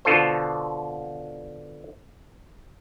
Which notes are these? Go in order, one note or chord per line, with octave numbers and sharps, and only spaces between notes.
B2 D3 F4 A4 C5